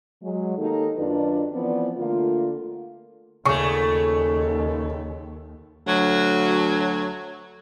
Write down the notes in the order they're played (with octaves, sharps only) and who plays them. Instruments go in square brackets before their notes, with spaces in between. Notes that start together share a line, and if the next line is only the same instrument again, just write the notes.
[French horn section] F#3 G#3
D#3 A#3 D#4 G4 A4
F#2 D#3 D4 F4 B4 D5
E3 F3 B3 C4 D5
D3 A3 A#3 F4
[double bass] D#2 [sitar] A#2 A3 [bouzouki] C#3 [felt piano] C#6
[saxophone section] D2 F#3